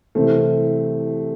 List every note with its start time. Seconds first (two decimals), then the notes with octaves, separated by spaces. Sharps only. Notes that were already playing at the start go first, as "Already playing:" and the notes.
0.15 C2 C3 E3 A3 C4